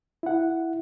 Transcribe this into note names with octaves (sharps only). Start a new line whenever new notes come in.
E4 F#5